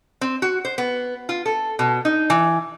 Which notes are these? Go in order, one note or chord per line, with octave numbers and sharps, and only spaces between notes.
C4
F#4
C5
B3
F4
A4
B2
D#4
E3